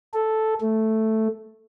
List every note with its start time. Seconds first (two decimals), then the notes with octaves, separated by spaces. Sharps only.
0.14 A4
0.61 A3